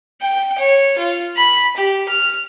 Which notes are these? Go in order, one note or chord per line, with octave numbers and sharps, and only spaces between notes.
G5
C#5
F4
B5
G4
F6